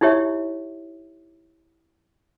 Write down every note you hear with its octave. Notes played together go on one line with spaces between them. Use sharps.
D#4 E4 G4 C#5 E5